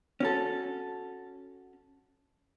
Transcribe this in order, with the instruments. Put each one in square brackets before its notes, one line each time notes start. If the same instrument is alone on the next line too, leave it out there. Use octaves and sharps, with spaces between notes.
[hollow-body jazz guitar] C#4 F#4 A4